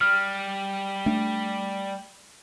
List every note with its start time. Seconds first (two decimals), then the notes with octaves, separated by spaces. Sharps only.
0.01 G3 F6
1.06 A3 D4